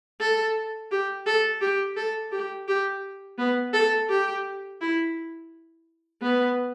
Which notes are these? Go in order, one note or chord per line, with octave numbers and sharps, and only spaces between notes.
A4
G4
A4
G4
A4
G4
G4
B3
A4
G4
E4
B3